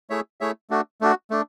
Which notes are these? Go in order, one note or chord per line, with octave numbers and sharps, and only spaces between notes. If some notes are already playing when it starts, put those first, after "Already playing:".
A3 E4 G#4 C#5 E5
A3 E4 G#4 C#5 E5
A3 D4 F#4
A3 D4 F#4
A3 D4